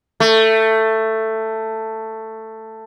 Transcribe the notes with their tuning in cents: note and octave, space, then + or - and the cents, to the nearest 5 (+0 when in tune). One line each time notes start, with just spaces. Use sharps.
A3 +10